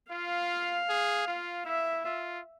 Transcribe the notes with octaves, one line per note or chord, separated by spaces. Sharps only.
F4 F5
G#4
F4
E4 E5
F4